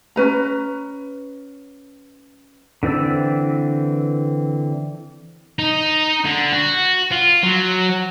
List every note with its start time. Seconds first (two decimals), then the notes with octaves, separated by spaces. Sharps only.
0.16 C#4 B4 A#5
2.83 D3 E3 C4 D5 E6
5.59 D#4
6.25 D3
6.52 F#4
7.12 F4
7.43 F#3